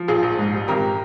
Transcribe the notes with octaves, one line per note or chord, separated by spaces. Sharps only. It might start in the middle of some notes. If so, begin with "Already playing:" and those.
Already playing: F3
A#1 F4 G#4
A#1
G#2
G3
G#1 G4 A#4